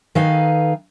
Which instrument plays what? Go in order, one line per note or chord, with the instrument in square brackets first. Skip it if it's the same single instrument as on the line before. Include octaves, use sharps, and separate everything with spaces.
[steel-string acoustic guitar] D#3 D#4 A4 B4 F5 G#5